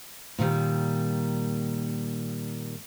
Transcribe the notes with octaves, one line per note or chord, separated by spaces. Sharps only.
A#2 D#3 G3